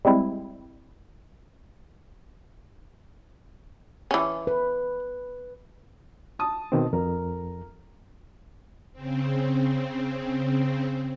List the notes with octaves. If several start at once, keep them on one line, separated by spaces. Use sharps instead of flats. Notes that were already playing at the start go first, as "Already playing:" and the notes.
G3 G#3 C4 E4
E3 C#4
B4
A5 D#6
B2 D#3 C4
F2 A#4
C#3 C4